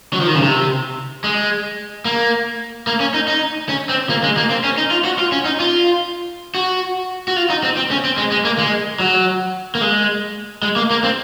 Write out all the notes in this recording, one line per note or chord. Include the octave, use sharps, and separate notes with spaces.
F#3
F3
D#3
C#3
C3
G#3
A#3
A#3
C#4
D#4
D#4
C#4
C4
A#3
G#3
A#3
C4
C#4
D#4
F4
F#4
F4
C#4
D#4
F4
F#4
F#4
F4
D#4
C4
C4
C#4
C4
G#3
G#3
A#3
G#3
F#3
A#3
G#3
G#3
A#3
A#3
C4